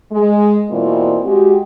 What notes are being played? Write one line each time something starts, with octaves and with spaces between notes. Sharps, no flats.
G#3
B2 E3 A#3 C4 F4 D5
G#3 F#4 G4